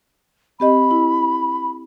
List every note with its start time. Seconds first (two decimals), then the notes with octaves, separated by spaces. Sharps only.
0.60 C4 G4 D#5 B5
0.91 E4